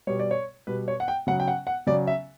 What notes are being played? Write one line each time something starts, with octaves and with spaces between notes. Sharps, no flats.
B2 G3 C#5
D5
C#5
B2 G3 B4
C#5
F#5
G5
C#3 F#3 F#5
G5
F#5
F#5
C#3 F#3 D5
E5